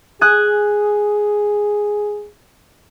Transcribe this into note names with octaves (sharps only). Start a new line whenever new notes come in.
G#4 G#5 D#6 F#6